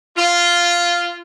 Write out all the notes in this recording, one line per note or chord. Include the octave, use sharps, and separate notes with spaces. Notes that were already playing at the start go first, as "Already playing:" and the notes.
F4